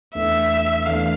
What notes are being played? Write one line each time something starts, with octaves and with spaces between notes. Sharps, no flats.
E2 E3 A3 D4 E5
E2 E3 A3 D4 F5